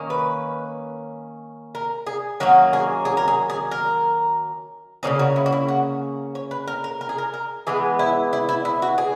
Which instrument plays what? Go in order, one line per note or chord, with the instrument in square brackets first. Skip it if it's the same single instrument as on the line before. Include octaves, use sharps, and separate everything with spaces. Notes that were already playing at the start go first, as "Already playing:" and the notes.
Already playing: [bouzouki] D#3 A#3 C#4
B4
A#4
G#4
D#3 F#3 A#3 C#4 F#4
G#4
G#4
A#4
G#4
G#4
A#4
C#3 F#3 A#3 C#4 G#4
F#4
E4
F#4
E4
F#4
C#5
B4
A#4
A#4
A#4
G#4
A#4
A#4
E3 G#3 B3 G#4
E4
E4
E4
E4
F#4
G#4